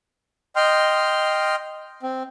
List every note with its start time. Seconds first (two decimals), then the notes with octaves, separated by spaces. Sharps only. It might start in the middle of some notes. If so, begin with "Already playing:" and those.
0.56 D#5 G5 C6 F6
2.03 C4